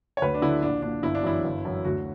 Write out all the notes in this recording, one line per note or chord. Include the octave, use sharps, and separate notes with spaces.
C#5
D2 B4
D4
D3 E4
A#1 D4
A#2 D4
G1 E4
D4
F#2 E3 E4
G1
F#2 E3
D2 F#4